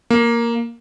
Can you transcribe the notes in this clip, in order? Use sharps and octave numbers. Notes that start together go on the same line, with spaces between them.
A#3